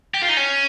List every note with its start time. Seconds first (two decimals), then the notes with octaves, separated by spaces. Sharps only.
0.14 G4
0.22 F4
0.29 D#4
0.37 C#4